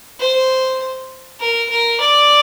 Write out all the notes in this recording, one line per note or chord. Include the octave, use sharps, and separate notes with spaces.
C5
A#4
A#4
D5